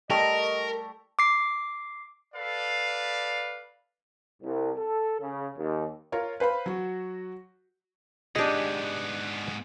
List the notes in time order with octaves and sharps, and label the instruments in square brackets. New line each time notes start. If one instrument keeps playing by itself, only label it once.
[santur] G3 A3 C#6 [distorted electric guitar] A#4 [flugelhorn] D#5
[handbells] D6 C7
[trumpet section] A4 B4 D5 F5
[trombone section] C2
A4
C#3
D#2
[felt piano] F4 A#4 C#5
B4 C5 F5 B5
F#3 F#4
[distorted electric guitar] G#2 B3 [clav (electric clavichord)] D4 D#5 [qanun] G4 G#4